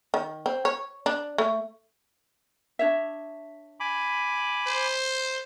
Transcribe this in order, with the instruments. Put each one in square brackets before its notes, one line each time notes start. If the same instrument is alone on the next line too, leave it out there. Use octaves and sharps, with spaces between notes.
[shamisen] D#3
C4
C#5
D4
A3
[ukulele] D4 C#5 E5
[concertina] G#5 B5 D6
[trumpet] C5